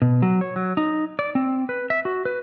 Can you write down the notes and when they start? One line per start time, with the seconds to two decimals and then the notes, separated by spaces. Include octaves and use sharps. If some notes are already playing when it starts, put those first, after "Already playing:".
0.02 B2
0.22 F#3
0.41 C#5
0.56 F#3
0.77 D#4
1.19 D5
1.35 C4
1.69 B4
1.90 E5
2.05 F#4
2.25 B4